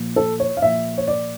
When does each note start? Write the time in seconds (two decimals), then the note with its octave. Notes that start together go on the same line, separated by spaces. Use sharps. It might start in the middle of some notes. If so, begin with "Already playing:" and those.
Already playing: A#2 F3
0.16 A4
0.40 C#5
0.57 F5
0.62 A#2 F3 E5
0.98 C#5
1.07 D5